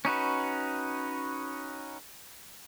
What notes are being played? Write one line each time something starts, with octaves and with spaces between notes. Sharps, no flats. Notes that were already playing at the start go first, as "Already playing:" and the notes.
C#4 D#4 F#4 B4